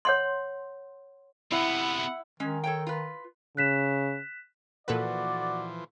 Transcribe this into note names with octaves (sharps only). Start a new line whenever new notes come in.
C#5 F#5 C6
C3 B3 E4 F#5
D#3 G#3 C#4
A4 C#5 G5
F4 B4
C#3 F#6 B6 E7
A#2 E3 F3 F#4 A4 B4 D5